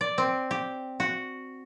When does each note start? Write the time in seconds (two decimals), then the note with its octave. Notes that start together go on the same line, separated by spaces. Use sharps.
0.01 D5
0.18 C4
0.51 G4
1.00 F#4